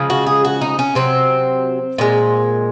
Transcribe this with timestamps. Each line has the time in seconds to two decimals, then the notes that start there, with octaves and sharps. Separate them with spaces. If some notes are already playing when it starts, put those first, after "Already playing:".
Already playing: C#3 F3 G#3
0.10 F#4
0.26 G#4
0.45 F#4
0.61 D#4
0.79 C#4
0.95 C3 F#3 C4
1.98 A#2 G#3